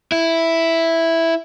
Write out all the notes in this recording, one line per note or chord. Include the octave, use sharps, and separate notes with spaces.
E4